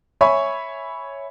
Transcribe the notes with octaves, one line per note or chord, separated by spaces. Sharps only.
C#5 E5 G#5 B5 C#6